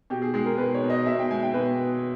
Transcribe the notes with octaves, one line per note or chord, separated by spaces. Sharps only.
B2 G4
G#4
G#3 G#4
A#4
B2 B4
C#5
B2
D#5
B2 E5
G5
G#3 G#5
G5
B2 B4